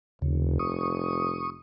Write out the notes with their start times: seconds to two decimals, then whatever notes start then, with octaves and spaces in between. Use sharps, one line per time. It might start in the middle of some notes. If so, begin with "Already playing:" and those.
0.22 F1 D#2 C#3
0.59 C#6 D#6